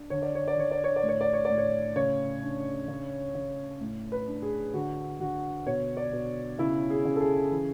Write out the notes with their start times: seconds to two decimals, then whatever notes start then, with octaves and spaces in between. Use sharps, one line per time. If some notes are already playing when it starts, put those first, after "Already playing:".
Already playing: D4
0.10 D3 C#5
0.22 D5
0.35 C#5
0.48 D5
0.56 D3 C#5
0.71 D5
0.84 C#5
0.96 D5
1.03 A2
1.09 C#5
1.21 D5
1.33 C#5
1.45 A2 D5
1.58 C#5
1.96 C#3 C#5
2.42 D4
2.88 C#3
3.34 C#3
3.81 A2
4.12 B4
4.27 D4
4.42 G#4
4.74 D3 F#4
5.20 D3 F#4
5.66 B2 C#5
5.97 D5
6.12 B2
6.59 C#3 E4
6.90 G#4
7.05 C#3
7.16 A4
7.20 G#4
7.51 E3